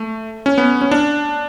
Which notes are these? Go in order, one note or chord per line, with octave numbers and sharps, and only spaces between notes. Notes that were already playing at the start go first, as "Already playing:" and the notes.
Already playing: A3
C#4
B3
C#4
D4